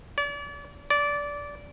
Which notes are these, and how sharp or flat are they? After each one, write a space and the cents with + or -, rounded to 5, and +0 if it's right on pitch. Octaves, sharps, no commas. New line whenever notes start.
D5 -40
D5 -20